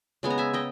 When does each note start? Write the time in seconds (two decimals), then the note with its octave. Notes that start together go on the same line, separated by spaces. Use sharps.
0.23 C#3 G#3 B3 G#5
0.30 A#5
0.38 E5 G#5
0.53 D#5 G5